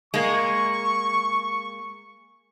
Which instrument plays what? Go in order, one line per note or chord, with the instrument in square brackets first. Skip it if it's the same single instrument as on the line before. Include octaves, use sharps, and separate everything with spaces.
[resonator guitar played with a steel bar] G#3 A#3 [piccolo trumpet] C#6